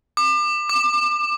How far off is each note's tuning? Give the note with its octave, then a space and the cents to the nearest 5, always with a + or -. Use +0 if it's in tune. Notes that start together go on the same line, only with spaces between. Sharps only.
D6 +35
D6 +20